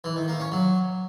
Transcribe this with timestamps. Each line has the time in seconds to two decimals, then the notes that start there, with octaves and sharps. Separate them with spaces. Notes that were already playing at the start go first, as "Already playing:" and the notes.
0.04 E3
0.16 D#3
0.28 A#3
0.40 C#4
0.52 F#3